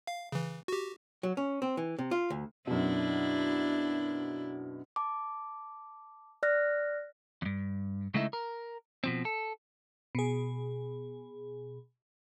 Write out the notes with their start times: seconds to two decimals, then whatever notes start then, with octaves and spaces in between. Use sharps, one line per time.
0.07 F5
0.32 C#3 E3
0.68 F#4 G4
1.23 F#3
1.37 C#4
1.62 C4
1.77 E3
1.99 C3
2.11 F4
2.30 D2
2.67 F#2 B2 D4 E4
4.96 A5 D6
6.43 D5 F6 F#6 A#6
7.42 E2 G2
8.14 C#3 G#3 A3 D#4 E4 E5
8.33 A#4
9.04 B2 F3 C4
9.25 A4
10.15 B2 G#4